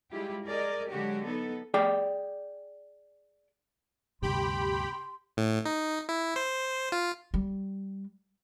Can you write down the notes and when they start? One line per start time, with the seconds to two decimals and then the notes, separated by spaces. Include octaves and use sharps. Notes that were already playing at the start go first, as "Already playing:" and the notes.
0.11 G3 G#3 E4 F4 G4
0.45 G#4 A#4 D5 D#5
0.88 D3 F#3 G#3 F#4 G4
1.25 B3 D#4 A4
1.74 G#4 D5 G5
4.22 D2 G2 C3 B3 G4 G5 B5 C6
5.37 A2
5.65 D#4
6.09 E4
6.36 C5
6.92 F4
7.34 G3